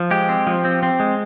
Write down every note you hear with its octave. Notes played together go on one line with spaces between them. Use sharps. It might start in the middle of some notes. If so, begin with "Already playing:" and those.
Already playing: F3
G#3 G4
C4
F3
C4
C4
G#3